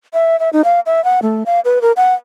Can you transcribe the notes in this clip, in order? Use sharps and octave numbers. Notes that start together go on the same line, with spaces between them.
E5
E5
D#4
F5
E5
F#5
A3
F5
B4
A#4
F#5